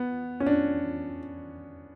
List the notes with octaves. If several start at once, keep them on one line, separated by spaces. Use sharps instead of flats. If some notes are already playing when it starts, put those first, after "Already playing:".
Already playing: B3
C#4
D4